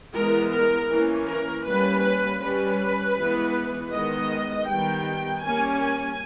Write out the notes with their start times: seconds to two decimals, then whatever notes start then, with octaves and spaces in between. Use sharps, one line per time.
0.13 E3 G#3 B3 A#4
0.52 A#4
0.89 E3 A#3 C#4
1.27 A#4
1.66 G3 A#3 C#4 B4
2.02 B4
2.41 G3 C#4 B4
3.16 E3 G#3 B3
3.92 D#3 G#3 B3 D#5
4.67 D#3 G3 B3 G5
5.43 G3 A#3 C#4 G#5
5.81 G#5